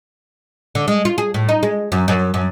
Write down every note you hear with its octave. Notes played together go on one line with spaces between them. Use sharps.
D3
G#3
F4
G#4
A2
D#4
G#3
F#2
F#2
F#2